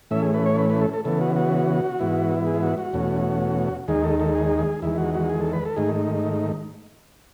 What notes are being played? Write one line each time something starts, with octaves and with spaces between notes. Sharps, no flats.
A2 E3 A3 C#4 E5
G#4
B4
C#5
B4
B4
A4
A4
C#3 E3 B3 A4
F#4
F#4
G#2 E3 B3 E4
G#4
F#4
F#4
E2 B2 A3 C#4
D#2 D#3 G#3 D#4 G#4
A4
A4
G#4
G#4
E2 D#3 G#3 E4
F#4
F#4
G#4
A4
B4
A4
G#2 D#3 A3 D#4 G#4